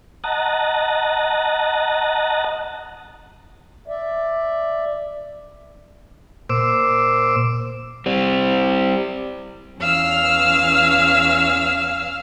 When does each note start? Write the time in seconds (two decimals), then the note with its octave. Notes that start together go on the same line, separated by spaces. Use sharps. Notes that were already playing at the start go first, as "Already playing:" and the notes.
0.24 D#5 F#5 A5 A#5
3.88 D5 E5
6.50 A#2 C5 D6 E6
8.06 G3 C4
9.79 E2 C#4 F5 E6 F6